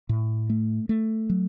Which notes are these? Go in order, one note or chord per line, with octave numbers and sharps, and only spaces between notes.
A2
A3
A3
F#3